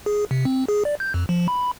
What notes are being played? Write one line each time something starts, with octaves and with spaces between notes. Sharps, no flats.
G#4
C3
C4
G#4
D5
G6
F2
F3
B5